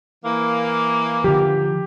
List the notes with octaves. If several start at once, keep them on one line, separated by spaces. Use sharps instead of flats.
E3 A#3
D3 F3 G4